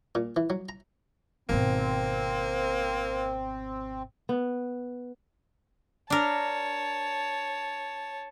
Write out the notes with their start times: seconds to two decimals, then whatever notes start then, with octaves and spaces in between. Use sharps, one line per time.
0.15 A#2
0.36 E3
0.50 F#3
0.69 A#5
1.49 G#1 B2 A#3 C4
4.29 B3
6.10 D4 A#4 C#5 A5